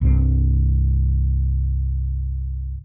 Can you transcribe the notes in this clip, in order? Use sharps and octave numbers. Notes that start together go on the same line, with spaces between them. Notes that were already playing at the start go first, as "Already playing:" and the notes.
C2 G2 F#3 C4